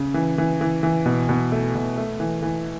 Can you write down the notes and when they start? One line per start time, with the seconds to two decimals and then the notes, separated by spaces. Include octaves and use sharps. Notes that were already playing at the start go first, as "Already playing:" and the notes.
Already playing: C#3
0.14 E3
0.38 E3
0.61 E3
0.83 E3
1.06 B2
1.29 B2
1.52 A3
1.75 B2
1.98 A3
2.20 E3
2.43 E3